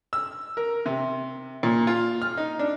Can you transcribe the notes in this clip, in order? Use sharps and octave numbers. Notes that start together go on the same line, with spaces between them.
E6
A#4
C3
A#2
F4
F6
D#4
D4